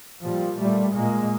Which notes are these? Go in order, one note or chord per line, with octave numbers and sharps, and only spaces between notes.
A#2 F3 G3
A#2 G3 A3
A#2 G#3 A#3